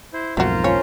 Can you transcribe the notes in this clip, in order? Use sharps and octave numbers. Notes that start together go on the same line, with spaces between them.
E4 C5
B1 F2 G#2 A3 F4 F#4 A#4 C5
F3 C#4 C#5